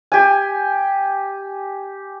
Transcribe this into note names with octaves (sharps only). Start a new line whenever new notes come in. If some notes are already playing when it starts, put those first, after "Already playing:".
G4 G#5